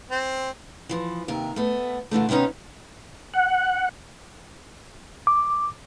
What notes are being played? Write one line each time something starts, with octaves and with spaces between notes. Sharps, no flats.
C4
E3 F3
D#2 C3 A#4
A3 B3
A#2 D3 E3 A3
C3 D#3 B3 C#4 D#4
F#5
D6